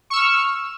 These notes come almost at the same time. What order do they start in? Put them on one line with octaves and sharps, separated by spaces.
C#6 E6 F6